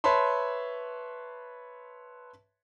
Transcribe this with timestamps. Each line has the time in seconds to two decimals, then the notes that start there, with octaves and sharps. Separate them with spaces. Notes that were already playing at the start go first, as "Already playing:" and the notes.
0.04 B4 C#5 E5 A5 B5 C6